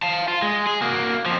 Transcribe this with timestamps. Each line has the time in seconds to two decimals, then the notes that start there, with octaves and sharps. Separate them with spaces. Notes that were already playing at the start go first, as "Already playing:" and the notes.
0.03 F5 A5
0.28 F4
0.42 G#3
0.67 G#4
0.82 A#3 F#4
1.26 F2 F3